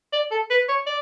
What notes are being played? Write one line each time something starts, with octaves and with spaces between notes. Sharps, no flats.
D5
A4
B4
C#5
D5